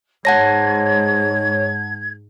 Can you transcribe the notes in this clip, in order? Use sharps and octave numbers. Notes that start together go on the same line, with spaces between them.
G#2 C#5 F#5 A5 G#6 A#6